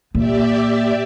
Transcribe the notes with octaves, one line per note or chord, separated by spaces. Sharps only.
A#2 G4 D5 E5